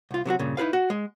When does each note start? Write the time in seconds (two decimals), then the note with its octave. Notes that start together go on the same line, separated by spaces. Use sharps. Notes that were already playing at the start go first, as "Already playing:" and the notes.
0.11 C2 F4
0.25 C3 F#3 D4 F#4
0.39 G2 A#2 C#3
0.57 D#4 E4 G#4 B4 F5
0.73 F#4
0.90 G#3